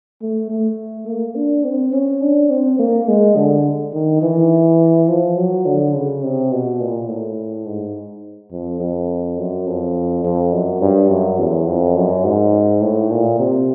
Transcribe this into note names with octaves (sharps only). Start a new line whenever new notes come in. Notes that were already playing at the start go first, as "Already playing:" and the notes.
A3
A3
A#3
D4
C4
C#4
D4
C4
A#3
G#3
D3
D#3
E3
F3
F#3
D3
C#3
C3
B2
A#2
A2
G#2
F2
F2
F#2
F2
F2
F#2
G2
F#2
E2
F2
F#2
G#2
A2
A#2
C3